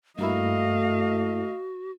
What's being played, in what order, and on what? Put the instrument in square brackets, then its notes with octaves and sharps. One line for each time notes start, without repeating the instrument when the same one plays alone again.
[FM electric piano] G2 A#3 E4 [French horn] A3 [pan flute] F#4 [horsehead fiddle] D#5 F5